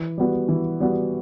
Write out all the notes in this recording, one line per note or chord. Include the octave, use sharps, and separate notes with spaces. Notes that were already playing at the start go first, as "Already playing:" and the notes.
Already playing: E3
G3 B3 F#4
E3
G3 B3 F#4